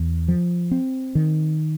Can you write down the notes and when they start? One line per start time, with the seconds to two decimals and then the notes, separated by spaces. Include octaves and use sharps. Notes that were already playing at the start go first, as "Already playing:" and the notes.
Already playing: E2
0.28 F3
0.71 C4
1.15 D#3